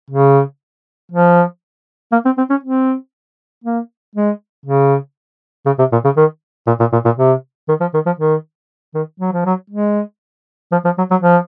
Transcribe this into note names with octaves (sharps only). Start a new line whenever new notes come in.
C#3
F3
A#3
C4
C4
C#4
C4
A#3
G#3
C#3
C#3
C3
A#2
C#3
D#3
A#2
A#2
A#2
A#2
C3
D#3
F3
D#3
F3
D#3
D#3
F#3
F3
F#3
G#3
F3
F3
F#3
F#3
F3